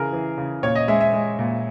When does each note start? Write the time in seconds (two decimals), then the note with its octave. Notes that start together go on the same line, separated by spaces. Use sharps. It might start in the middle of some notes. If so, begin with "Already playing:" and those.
Already playing: C#3 E3 G#4 A#4
0.13 E3
0.38 C#3
0.63 A#2 C#5
0.75 D#5
0.88 G#3 E5
1.01 E5
1.13 G#3
1.39 A#2